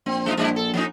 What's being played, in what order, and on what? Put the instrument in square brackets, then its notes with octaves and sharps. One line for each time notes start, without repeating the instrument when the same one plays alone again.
[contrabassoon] A#1 [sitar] C4
[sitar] G#3 D#4 F4
[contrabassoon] A#1 [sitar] G3 D4 E4
[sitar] A4
F3 C#4 D#4